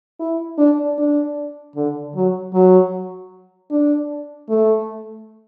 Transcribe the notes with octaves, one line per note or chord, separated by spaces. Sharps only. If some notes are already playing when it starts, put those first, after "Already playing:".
E4
D4
D4
D3
F#3
F#3
D4
A3